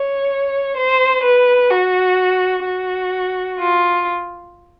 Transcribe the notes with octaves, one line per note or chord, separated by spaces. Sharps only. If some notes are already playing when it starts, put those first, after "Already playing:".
Already playing: C#5
C5
B4
F#4
F#4
F4